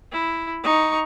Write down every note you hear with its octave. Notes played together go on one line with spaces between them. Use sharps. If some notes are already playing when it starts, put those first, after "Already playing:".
E4
D#4 C#6